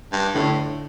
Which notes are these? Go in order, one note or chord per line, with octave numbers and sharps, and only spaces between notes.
G2
A2 D3